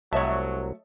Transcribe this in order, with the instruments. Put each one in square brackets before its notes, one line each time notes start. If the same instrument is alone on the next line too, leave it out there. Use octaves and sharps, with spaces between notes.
[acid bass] C2 [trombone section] F#3 [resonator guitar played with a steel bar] A3 E5 [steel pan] C#5 D#5 A5